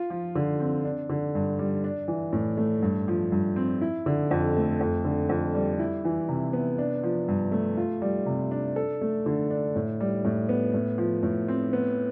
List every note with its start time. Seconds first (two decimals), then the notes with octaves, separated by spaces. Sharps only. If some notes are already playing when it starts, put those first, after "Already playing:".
Already playing: F4
0.10 F3
0.35 D3
0.60 C4
0.85 D4
1.10 D3
1.35 G2
1.59 G3
1.84 D4
2.08 E3
2.33 A2
2.57 A3
2.82 G2
3.08 F3
3.32 G2
3.56 C4
3.82 E4
4.06 D3
4.31 F2
4.56 A3
4.81 F2
5.05 D3
5.29 F2
5.54 G3
5.79 E4
6.05 E3
6.29 C3
6.53 B3
6.78 D4
7.03 F3
7.28 G2
7.52 A3
7.77 F4
8.02 G3
8.26 C3
8.51 D4
8.76 A4
9.01 A3
9.26 D3
9.50 D4
9.76 A2
10.00 G3
10.25 A2
10.49 B3
10.74 A2
10.98 F3
11.23 A2
11.48 C4
11.73 B3